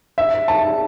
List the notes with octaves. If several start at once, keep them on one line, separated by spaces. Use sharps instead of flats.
E5
A5